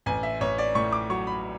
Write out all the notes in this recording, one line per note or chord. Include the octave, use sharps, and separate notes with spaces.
A1 G#5
E5
A1 C#5
D5
A2 C#6
D6
F#3 C#6
B5